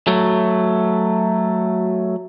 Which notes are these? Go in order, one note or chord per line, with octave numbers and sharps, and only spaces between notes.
F#3 A3